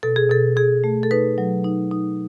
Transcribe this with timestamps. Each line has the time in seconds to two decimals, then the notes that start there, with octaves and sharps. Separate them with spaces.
0.03 B2 A4
0.16 G#4
0.30 B2 A4
0.57 B2 G#4
0.84 A3
1.03 A4
1.11 D#4 B4
1.38 F#3
1.64 D#4
1.91 D#4